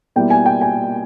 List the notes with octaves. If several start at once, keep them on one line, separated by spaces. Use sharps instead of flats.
B2 G3 A#3 E4 G5
G#5
G5
G#5